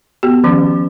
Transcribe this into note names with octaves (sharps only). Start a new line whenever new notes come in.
B3 F#4 G4
D#3 F3 C#4